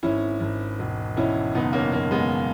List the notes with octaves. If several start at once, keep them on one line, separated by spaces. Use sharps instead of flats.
G#1 C#4 E4
G#1
E1
E1 C#4 E4
F#1 B3 D#4
A#3 C#4
F#1 A#3
G#3 B3